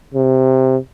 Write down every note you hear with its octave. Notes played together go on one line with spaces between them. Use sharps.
C3